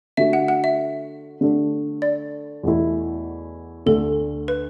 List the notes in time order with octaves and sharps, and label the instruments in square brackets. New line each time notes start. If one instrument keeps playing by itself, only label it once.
[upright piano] D3 A3 F#4 [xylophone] E5
[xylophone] F#5
F#5
E5
[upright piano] D3 A3 D4
[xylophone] D5
[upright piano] E2 B2 A3 E4
[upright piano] D2 D3 A3 [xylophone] A4
[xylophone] B4